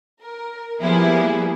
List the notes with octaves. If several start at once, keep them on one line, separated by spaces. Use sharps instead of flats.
A#4
F3 G3 A#3 B3 E4 G#4